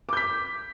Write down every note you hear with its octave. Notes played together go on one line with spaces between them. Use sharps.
D6 G6 B6